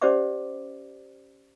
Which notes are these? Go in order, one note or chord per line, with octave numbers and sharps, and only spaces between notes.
C#4 G4 C5 D5 E5 D6